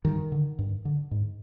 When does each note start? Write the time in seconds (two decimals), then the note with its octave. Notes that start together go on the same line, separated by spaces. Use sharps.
0.05 G2 D#3
0.32 D3
0.59 G2
0.85 D3
1.11 G#2